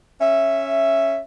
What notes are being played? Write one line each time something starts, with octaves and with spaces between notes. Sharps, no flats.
C#4 E5